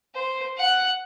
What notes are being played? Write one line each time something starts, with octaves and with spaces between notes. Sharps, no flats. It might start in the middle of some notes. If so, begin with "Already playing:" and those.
C5
F#5 F#6